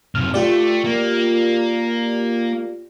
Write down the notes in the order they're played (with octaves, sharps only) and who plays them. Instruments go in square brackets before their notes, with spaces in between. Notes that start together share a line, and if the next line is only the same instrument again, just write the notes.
[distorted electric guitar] F#2 C3 [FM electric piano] F6
[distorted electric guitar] A3 [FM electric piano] F4 G4 D5
[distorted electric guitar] A#3